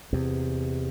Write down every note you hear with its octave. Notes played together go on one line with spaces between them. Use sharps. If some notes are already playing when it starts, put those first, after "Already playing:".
E2 C3